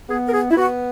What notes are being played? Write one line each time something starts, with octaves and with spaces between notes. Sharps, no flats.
B3 G#4
A#4
G#4
E4
B3 F#4